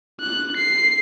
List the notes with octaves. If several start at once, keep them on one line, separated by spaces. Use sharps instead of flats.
F#6
C7